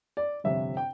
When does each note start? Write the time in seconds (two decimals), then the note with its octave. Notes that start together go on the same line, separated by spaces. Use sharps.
0.17 D5
0.44 G1 F2 C3 E5
0.77 G5